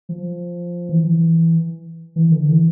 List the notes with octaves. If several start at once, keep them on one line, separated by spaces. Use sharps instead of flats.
F3
E3
E3
E3
D3
E3